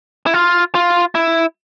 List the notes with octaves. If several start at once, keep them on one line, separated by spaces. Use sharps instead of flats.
E4
F4
F4
E4